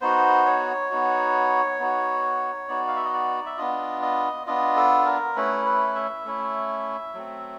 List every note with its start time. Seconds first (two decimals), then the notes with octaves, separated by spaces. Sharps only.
0.01 B3 D#4 F#4 C5
0.46 C#5
0.90 B3 D#4 F#4
1.80 B3 D#4 F#4
2.69 B3 D#4 F#4 D5
2.88 F5
2.96 E5
3.05 D#5
3.13 D5
3.46 E5
3.57 B3 D4 F4 D#5
4.02 D#5
4.46 B3 D4 F4 D#5
4.76 A4
5.06 A#4
5.36 A3 C#4 E4 B4
5.66 B4
5.95 E5
6.25 A3 C#4 E4
7.14 F#3 A3 C4